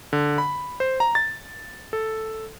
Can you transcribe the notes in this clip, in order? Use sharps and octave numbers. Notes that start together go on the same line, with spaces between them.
D3
B5
C5
A#5
A6
A4